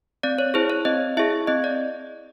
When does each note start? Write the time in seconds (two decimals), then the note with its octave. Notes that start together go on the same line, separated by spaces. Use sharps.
0.23 C4 D5
0.38 C#5
0.54 E4 G#4 C5
0.70 C#5
0.85 C4 D#5
1.17 E4 G#4 E5
1.47 C4 D#5
1.64 D5